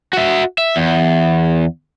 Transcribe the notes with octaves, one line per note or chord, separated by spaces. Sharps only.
F#4 E5
E5
E2